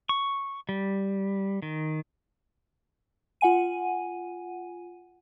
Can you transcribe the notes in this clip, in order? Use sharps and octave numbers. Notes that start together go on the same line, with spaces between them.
C#6
G3
D#3
F4 F#5 G#5 D#7